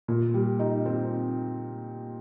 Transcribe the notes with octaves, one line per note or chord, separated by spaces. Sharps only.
A#2
G3
D#4
C4